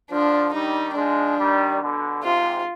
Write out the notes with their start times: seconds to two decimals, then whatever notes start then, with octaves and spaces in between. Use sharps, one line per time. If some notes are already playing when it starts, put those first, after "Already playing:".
0.11 D3 F3 D4
0.54 D#3 G3 D#4
0.96 F3 G#3 D4
1.38 D#3 G3
1.81 B2 D3
2.23 G#2 C3 F4